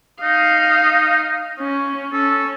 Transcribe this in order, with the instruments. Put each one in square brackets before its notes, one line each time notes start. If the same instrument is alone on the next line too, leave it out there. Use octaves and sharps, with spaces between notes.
[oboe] D#4 [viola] D#5 F5
[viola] C#4
[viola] C#4 [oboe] A4